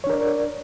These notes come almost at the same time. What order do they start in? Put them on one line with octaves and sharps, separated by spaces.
C#5 D4 A#4 D5